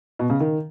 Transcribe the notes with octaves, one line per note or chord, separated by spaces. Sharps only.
B2
C#3
D#3